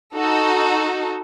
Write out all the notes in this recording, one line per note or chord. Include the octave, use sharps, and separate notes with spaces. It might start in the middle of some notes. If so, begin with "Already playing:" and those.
D#4 F#4 A4